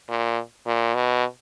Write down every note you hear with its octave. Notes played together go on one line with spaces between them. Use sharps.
A#2
A#2
B2